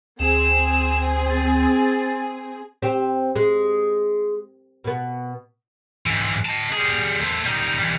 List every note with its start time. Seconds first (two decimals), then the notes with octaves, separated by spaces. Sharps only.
0.20 D2 C4 G#4 E7
1.29 A6
2.82 C4 G4 C5
3.36 G#3
4.84 B2 B3
6.06 G#2 E3
6.45 D#5 A5
6.73 G3 G#4
7.21 A3 C5
7.46 G3 D#4
7.78 E3 G3